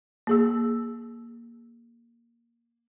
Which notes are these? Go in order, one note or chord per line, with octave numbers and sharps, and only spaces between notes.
A#3 G#4 E6